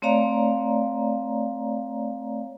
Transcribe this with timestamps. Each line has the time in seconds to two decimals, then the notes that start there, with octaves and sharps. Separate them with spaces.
0.02 A3 C4 C#5 D5 F5 A#5